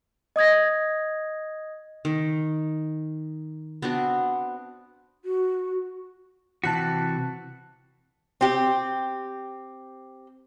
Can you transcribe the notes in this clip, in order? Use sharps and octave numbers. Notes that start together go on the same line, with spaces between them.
D#5 D#6 G#6 A#6
D#3
B3 C4 D4 F#4
F#4
C3 E3 F#4 A5 F#6 B6
C4 G4